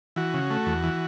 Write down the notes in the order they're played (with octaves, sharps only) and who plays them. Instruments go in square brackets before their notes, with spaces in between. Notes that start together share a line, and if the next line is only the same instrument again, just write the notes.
[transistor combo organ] E3 F#4
C#3
A3
E2
E3